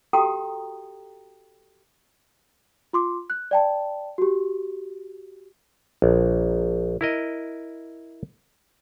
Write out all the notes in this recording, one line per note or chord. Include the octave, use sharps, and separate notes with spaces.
F#4 G4 A4 G5 A#5 D#6
F4 C6 D6
F#6
D5 G5 A5
F#4 G4
A#1
E4 A#4 D#5